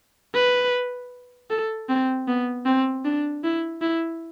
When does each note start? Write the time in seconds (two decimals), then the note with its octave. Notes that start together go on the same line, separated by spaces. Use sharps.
0.35 B4
1.50 A4
1.89 C4
2.28 B3
2.66 C4
3.05 D4
3.44 E4
3.81 E4